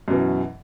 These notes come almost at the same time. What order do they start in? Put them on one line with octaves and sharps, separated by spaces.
F#2 B2 E3